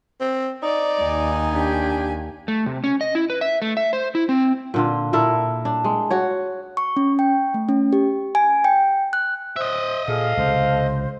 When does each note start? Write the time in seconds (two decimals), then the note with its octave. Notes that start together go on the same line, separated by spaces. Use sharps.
0.21 C4
0.63 D#4 D5
1.02 D#2 G#5
1.53 D4 G4
2.48 A3
2.66 C3
2.84 C#4
3.01 D#5
3.15 E4
3.30 B4
3.41 E5
3.62 A3
3.77 E5
3.93 C5
4.15 E4
4.29 C4
4.74 A#2 D3 F4
5.13 A#2 E4 A4 A#4
5.65 D4
5.84 G#3
6.10 F#4 C#5
6.77 C#6
6.96 C#4
7.19 G5
7.54 A3
7.69 C#4
7.93 G4
8.35 G#5
8.64 G5
9.13 F#6
9.56 C5 D#5 E5
10.08 A#2 G#4 A4 F5
10.37 C#2 C3 C5